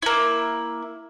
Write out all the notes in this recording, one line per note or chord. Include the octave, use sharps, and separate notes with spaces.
A#3 E4